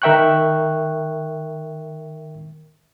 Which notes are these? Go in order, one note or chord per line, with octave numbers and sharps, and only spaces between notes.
D#3 A#4 E5 G5 C#6 F#6